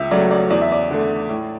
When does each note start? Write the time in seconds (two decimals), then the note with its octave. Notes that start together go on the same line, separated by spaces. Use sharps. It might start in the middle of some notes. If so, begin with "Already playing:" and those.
Already playing: C#2 E5
0.11 C#3 F#3 A3 D5
0.31 D5
0.50 E2 D5
0.61 E5
0.72 D5
0.91 D3 A3
1.29 A2